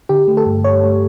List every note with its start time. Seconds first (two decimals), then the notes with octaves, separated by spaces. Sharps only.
0.09 D3 G4
0.28 A3
0.37 A4
0.46 G2
0.64 A3 C#5
0.84 A3